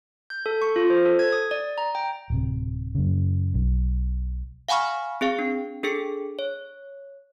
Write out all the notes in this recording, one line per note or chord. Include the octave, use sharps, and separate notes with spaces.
G6
A4
C#6
F4
C5
A4
G#6
D#6
D5
A#5
G5
D1 C3
F#2 C#3
B1
F5 F#5 G#5 B5 C#6 F6
C4 G#4 F5
D4
D4 G#4 A4 C#7
C#5